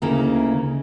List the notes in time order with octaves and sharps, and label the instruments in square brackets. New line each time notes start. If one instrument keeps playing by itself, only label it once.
[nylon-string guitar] D2 C#3 A#3 D#4 E4 A#4